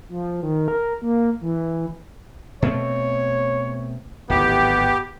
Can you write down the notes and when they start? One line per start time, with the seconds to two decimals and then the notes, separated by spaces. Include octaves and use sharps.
0.09 F3
0.43 D#3
0.68 A#4
1.02 A#3
1.41 E3
2.62 B2 A3 C4 C#5
4.30 D1 G#1 B3 G4